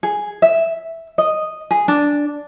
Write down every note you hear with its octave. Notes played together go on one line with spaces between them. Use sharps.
G#4
E5
D#5
G#4
D4